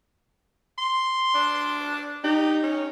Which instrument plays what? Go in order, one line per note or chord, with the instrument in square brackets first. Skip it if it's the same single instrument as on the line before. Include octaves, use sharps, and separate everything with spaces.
[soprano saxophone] C6
[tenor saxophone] D4
[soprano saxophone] D#4 [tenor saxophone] G4
[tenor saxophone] C#4